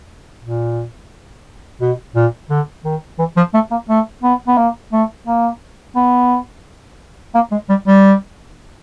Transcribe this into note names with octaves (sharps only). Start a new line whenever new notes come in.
A#2
B2
A#2
D3
D#3
E3
F3
A3
A#3
A3
B3
B3
A#3
A3
A#3
B3
A#3
G#3
G3
G3